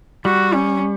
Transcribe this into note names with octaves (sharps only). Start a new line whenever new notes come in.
G3 F#4
C#4